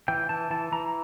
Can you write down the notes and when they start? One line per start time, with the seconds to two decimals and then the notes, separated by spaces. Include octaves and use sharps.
0.08 E3 G5
0.29 E3 A5
0.51 E3 A5
0.72 E3 A#5